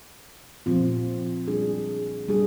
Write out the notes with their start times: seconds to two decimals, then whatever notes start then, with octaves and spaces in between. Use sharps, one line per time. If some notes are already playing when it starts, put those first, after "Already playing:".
0.66 A#2 F3 C4 F4
1.47 G3 D4 G#4
2.28 G3 D4 G#4